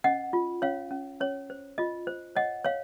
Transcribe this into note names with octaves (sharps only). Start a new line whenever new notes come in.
C#4 D#5 F#5
F4
C#4 C#5 F5
C#4
C#4 C#5
C5
F4 D#5
C5
C#5 D#5 F#5
C#5 F5